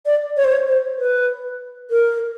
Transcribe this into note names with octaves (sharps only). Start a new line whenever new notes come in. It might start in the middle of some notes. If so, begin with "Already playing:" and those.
D5
C#5
C5
C#5
C5
B4
A#4